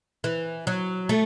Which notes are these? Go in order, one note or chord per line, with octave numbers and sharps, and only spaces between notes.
E3
F#3
A3